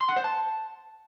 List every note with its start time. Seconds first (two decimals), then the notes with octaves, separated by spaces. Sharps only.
0.01 C6
0.09 F#5
0.16 C5
0.24 A5